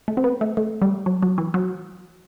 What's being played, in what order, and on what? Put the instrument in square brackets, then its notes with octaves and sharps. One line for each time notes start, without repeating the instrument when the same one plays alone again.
[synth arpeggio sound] A3
C4
B3
A3
A3
G3
F#3
F#3
E3
F#3